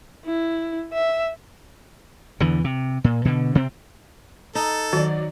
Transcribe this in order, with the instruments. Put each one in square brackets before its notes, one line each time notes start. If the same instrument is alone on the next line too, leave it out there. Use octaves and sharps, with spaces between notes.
[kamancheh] E4
E5
[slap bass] E2 D3 E3
C3
A#2
B2 D3
C3 C4
[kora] D#4 [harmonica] A4
[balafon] D#3 [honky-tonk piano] F#3 D5